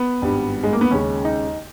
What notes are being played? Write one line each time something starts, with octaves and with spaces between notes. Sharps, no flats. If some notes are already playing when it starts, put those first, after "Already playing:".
Already playing: B3
G#1 G2 G3
G#3
A#3
B3
D#2 C#3 G#3 C#4
D#4